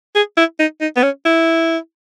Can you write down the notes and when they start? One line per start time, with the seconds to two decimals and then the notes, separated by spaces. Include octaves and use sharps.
0.16 G#4
0.37 E4
0.59 D#4
0.81 D#4
0.97 B3
1.03 C#4
1.25 E4